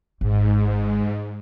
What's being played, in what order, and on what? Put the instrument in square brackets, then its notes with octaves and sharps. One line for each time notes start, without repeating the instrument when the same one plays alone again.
[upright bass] G#1 [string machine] G#2